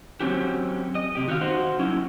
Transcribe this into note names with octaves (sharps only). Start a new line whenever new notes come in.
F#3 C4 C#4 F#4 G4
D#5
C3 G4
D#3 F#4 G4 D#5 F5
D#4 F#4 C5
F#3 C#4 E4